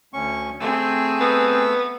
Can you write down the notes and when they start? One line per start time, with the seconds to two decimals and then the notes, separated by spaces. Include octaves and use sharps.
0.13 D2 C#4 C#6
0.60 A3 C4 G#4 E6
1.21 B3